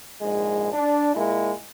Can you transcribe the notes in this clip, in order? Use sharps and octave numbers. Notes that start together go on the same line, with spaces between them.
A#1 G#2 G#3
D4
A#2 G#3 A#3 E4